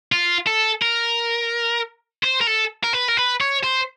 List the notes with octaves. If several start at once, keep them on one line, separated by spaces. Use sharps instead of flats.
F4
A4
A#4
C5
A#4
A4
A#4
B4
A#4
B4
C#5
C5